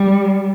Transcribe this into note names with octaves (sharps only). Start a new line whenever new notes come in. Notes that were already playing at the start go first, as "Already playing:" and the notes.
Already playing: G3